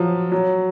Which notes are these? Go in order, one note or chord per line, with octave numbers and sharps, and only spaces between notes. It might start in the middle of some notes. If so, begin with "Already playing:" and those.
Already playing: F3 F#3
F#3